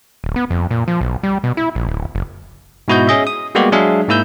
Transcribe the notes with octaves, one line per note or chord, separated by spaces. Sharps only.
D1
B3
F2
A#2
F3
B1
G3
B2
E4
A#1
D1
F#1
G#2 B2 E4 F#4 D#5 G6
C#4 G#4 D#5 E5
D#6
G3 G#3 A#3 B3 F#4 G4
F#3 G#3 D4 G#4 E5 F5
G#2 A#3 E4 E6 G6